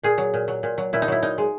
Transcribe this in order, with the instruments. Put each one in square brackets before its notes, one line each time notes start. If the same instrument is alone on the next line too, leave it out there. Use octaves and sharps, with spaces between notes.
[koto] A#2 G#4
F#3
A#2
F#3
A#2
F#3
A#2 E4
D#4
F#3 E4
A#2 D#4
G#3